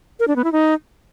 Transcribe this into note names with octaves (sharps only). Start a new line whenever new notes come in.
A#4
D4
B3
E4
D#4